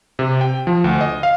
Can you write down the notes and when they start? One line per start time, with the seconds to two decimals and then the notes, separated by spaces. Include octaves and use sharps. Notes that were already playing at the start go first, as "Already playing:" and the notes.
0.19 C3
0.41 G5
0.67 F3
0.84 D2
1.01 D#5
1.23 F5